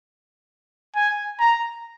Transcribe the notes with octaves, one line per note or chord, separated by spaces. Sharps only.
G#5
A#5